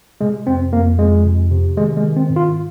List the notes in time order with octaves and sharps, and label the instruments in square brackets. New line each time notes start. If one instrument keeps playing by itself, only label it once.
[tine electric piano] C3 G#3
F2 C4
F2 A#3
F2 G#3
C3
C3
D#3 G#3
G#3
D#3
C4
G#2
F4